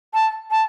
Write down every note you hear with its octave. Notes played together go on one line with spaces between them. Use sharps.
A5
A5